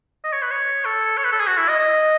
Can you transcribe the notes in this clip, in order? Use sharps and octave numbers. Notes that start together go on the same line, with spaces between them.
D#5
C#5
B4
C#5
A4
C#5
B4
A4
G#4
F#4
E4
D#5
D#5